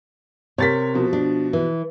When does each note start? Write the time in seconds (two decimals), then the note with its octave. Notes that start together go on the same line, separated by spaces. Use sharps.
0.58 C3 A#4 C#5 A6 B6
0.94 B2 F3
1.13 D4
1.53 E3